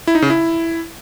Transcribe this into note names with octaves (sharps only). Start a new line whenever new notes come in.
E4
D#4
C#3
E4